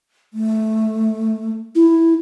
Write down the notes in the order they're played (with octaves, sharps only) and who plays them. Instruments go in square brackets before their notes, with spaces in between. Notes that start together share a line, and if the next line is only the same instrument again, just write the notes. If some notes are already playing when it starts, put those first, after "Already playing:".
[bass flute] A3
[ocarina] E4